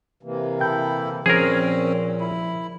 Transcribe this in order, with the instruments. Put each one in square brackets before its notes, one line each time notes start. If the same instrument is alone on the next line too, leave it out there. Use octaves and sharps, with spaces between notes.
[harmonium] C3 E3 A#3
[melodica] E4 A4 [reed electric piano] G5 G6
[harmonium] A#2 [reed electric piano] F3 [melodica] C4 C#4 [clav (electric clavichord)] G#4 A#4
[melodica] E4